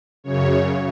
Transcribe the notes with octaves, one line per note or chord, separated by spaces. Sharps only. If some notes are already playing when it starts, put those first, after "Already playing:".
F#2 C#3 C#5